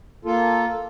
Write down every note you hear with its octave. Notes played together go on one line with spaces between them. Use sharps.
A#3 F4 A4